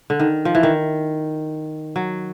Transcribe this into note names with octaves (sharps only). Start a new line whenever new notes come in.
D3
D#3
F3
E3
D#3
F#3